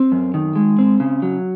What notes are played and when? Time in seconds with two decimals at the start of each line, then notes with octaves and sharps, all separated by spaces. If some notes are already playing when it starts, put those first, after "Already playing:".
Already playing: C4
0.12 F#2
0.34 D#3
0.56 G#3
0.79 C4
1.00 C#3
1.22 F#3